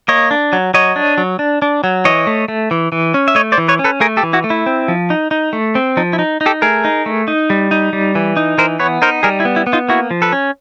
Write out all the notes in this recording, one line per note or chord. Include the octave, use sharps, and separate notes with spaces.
A#3 C#5 D#5
D4
F#3
F#3 C#5 D#5
D4
F#3
D4
D4
F#3
E3 C#5 D#5
A3
A3
E3
E3
C#4
E5
A3 C#5 D#5
C5 D5
E3
B4 C#5
C#4
A4 B4
A3 G#4 A#4
G4 A4
E3
E4 F#4
A3
E4
C4
F3
D#4
D#4
A3
C4
F3 D#4
E4
D#4
D#4
G4 A4
A3 G#4 A#4
D#4
A3
D#4
G3
D#4
G3
E3
D#4
E3 A#4 C5
B3 B4 C#5
D#4 A#4 C5
G3 G#4 A#4
E4
B3
E4
B3
D#4 F4
A#3 E4 F#4
F3
A4 B4
C#4